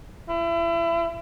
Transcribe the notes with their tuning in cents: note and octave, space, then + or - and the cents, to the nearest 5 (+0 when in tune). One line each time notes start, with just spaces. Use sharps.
E4 +30